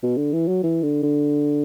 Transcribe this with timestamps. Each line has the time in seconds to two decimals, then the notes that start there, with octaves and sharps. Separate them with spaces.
0.03 B2
0.17 D3
0.33 E3
0.48 F#3
0.63 E3
0.83 D3
1.03 D3